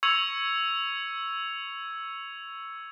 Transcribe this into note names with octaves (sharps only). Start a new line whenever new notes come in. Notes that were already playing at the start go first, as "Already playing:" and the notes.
C#6 E6 G#6 C#7 F7